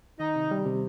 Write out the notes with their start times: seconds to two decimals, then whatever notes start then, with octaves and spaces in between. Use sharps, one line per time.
0.19 D#3 D#4
0.35 C3
0.51 G3
0.66 C3